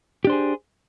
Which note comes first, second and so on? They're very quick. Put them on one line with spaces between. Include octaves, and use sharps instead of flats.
G4 D4 C5 G#4